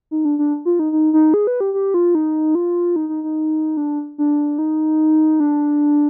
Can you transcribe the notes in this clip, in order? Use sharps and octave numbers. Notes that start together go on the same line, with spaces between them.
D#4
D4
D4
F4
D#4
D#4
D#4
G#4
B4
G4
G4
F4
D#4
F4
D#4
D#4
D#4
D4
D4
D#4
D4